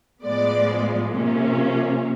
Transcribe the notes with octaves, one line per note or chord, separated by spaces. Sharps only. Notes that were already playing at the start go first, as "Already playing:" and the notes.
A2 F3 G#3 B3 D5
C3 F3 A#3 C#4